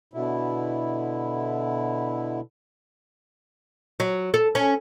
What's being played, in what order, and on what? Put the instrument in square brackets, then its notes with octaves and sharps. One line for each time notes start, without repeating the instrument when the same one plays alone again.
[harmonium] B2 D3 E4
[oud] F#3
A4
C#4